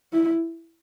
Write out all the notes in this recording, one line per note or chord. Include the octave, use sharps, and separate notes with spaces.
E4